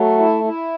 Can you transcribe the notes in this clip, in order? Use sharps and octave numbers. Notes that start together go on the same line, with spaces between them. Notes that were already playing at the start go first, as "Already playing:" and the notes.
Already playing: F#3 A3
E4
E4